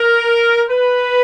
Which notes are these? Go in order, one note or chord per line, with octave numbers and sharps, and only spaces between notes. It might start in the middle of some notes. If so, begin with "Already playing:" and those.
Already playing: A#4
B4